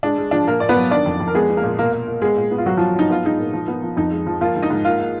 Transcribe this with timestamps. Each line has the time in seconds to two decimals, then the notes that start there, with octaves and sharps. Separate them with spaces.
0.03 G#3 D4
0.18 G#3
0.31 F3 D4
0.47 A#2 A#3 A#4
0.60 A#2 D5
0.69 B3 B4
0.76 F#3
0.91 D#3 D4 D5
1.06 F2
1.20 F2
1.27 A#4
1.35 G#3 B3 G#4
1.50 B3
1.57 A#3 A#4
1.64 A#2
1.79 B2 A#3 A#4
1.93 A#3
2.08 A#3
2.22 G#3 B3 G#4
2.37 A#2
2.51 B3
2.58 F4
2.66 F#3 B3 F#4
2.77 F3 F#3 F4
2.95 F#3 D#4
3.10 B3 F4
3.24 G#3 D#4
3.38 A#2
3.53 F3
3.68 B3
3.83 F3
3.97 F2 D#4
4.11 G#3
4.27 F3
4.41 F3 A#3 F4
4.55 G#2
4.62 D#4 D#5
4.70 G#2
4.85 A#3 F4 F5
4.99 A#3